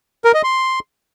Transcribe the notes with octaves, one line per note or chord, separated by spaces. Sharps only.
A#4
D#5
C6